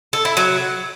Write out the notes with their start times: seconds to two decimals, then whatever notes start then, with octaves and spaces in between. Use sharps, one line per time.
0.13 A4
0.25 E4
0.37 F#3